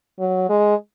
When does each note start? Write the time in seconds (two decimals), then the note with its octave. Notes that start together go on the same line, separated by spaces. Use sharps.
0.19 F#3
0.49 G#3